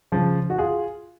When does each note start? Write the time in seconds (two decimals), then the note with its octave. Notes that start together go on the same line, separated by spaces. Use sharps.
0.12 C#3 F3
0.50 F#4
0.58 F4 G#4